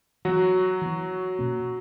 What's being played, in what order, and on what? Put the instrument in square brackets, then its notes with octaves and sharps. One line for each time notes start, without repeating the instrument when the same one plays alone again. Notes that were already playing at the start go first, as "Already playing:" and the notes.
[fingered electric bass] E3 B3 [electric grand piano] F#3 F#4
[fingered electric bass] E3 B3
B2 A#3 C#4